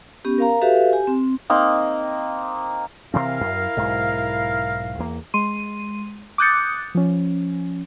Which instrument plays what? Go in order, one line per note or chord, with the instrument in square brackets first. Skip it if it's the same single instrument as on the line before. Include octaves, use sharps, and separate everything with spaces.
[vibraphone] B3 C#4 G4
A#4 F5 A#5
F#4 G4 A4 B4 E5 F5
G4 G#5
C4
[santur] A#3 C4 D#4
[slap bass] C3 E3 C4 [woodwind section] E4 A#4 F5
[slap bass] F#2
B1 G#2
E2 A#3
[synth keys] G#3 C6 D#7
D6 D#6 F#6 G6 A6 C#7
F3 C#4